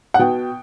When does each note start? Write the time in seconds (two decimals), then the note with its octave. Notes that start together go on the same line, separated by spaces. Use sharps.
0.14 F#5
0.19 B2 G5